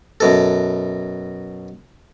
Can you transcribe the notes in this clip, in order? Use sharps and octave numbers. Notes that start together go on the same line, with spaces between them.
F#2 B2 A4